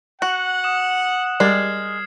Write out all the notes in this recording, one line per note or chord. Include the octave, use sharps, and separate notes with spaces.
F#4 F#5 F#7
D#6 E7
G3 G#3 A#4 D5 F6 G#6 C7